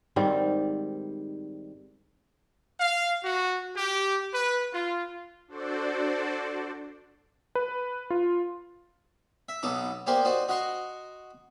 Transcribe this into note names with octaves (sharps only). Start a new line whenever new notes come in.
G#2 D#3 G3 C4
F5
F#4
G4
B4
F4
D4 F#4 A4 C5 D5
B4
F4
E5
B1 F#3 B3 D#4 A4 D6
A#3 B3 G4 C5 D5 G#5
D#4 F#4 C5 D5
F#4 D#5 F#5 A#5 C6 C#6